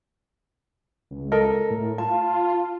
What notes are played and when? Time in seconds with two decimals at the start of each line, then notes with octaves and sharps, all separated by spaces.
1.11 C#2
1.32 A4 A#4 D#5
1.70 A2
1.98 F4 A5